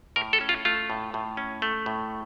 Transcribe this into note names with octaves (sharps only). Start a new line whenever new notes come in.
A2 A#4
A4
C#4
F4
A3 F4
A2
A2
C#4
A3
A2